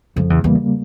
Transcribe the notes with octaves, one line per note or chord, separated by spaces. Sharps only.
F2 C#3
E2
E2 G3 A#3